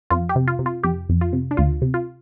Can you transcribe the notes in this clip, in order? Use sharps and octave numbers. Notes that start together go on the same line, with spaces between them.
F2 F4
G4
C3
F4
C3
F4
F2 G4
F2
F4
C3
D4
D2 F4
C3
F4